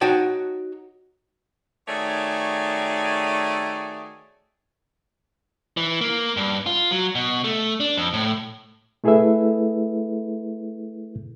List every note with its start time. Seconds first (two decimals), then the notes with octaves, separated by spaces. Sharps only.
0.01 D#4 F#4 C#5 G5 A5
1.88 D#3 A3 F#4 G#4 C#5 D5
5.77 E3
6.01 A#3
6.37 G2
6.66 F4
6.91 F#3
7.15 B2
7.44 A3
7.80 D4
7.97 F2
8.13 A2
9.04 A3 E4 G#4 A4 B4 E5